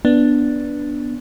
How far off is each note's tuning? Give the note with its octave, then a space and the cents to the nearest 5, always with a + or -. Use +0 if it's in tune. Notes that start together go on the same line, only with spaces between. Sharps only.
B3 -10 D4 +0